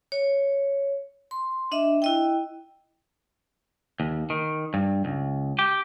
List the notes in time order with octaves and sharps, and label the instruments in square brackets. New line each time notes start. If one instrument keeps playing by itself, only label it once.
[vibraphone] C#5
C6
D4 D#5 E5
E4 D#5 G5
[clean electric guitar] D#2
D#3
G2
C#2
G4